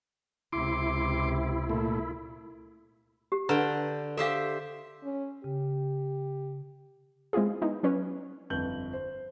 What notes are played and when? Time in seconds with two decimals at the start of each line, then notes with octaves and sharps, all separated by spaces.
0.53 C#2 C3 E4 C6 D6
1.69 A#2 A3
3.32 G4
3.49 D3 B4 G5 A#5
4.17 G4 A4 C5 E5 F5
5.04 C#4
5.44 C#3 G4
7.33 G#3 C4 E4 F4 G#4
7.62 G#3 B3 D#4 E4
7.83 F#3 C#4 B4 C#5
8.50 G1 F2 G6 F#7
8.93 C5